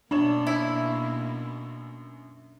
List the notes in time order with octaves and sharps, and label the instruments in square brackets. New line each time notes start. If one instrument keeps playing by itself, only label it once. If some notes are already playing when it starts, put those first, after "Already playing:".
[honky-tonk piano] F#2 C#5 E7 [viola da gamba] B2 A#3 [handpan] D4
[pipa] E4